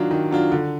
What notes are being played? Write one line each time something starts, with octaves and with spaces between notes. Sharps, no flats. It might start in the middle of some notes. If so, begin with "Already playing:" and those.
Already playing: D#3 F#3 D4 F4
D#3
F#3 D4 F4
D3